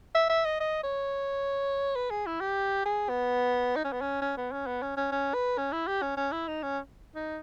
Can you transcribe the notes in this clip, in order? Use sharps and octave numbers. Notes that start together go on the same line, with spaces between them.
E5
E5
D#5
D#5
C#5
B4
G#4
E4
G4
G#4
B3
D#4
C#4
B3
C#4
C#4
B3
C#4
B3
C#4
C#4
C#4
B4
C#4
E4
G4
C#4
C#4
E4
D#4
C#4
D#4